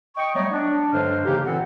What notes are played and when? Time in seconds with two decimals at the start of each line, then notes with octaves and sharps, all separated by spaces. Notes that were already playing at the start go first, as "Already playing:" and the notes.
0.17 D#5 G5 C#6
0.34 F#3 G3 A3 B3 C#5 D#5
0.51 D4
0.93 G2 D3 F#3 G#3 C5 F6
1.25 C#3 E3 A#3 D#4 G4
1.45 A#2 E3 B3 C4 A4 F#5